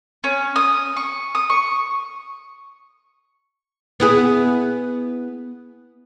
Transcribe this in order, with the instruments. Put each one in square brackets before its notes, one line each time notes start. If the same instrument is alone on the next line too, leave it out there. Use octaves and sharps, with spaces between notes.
[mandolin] C#4
D#6
C#6
D#6
C#6
[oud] B3 E4 G#4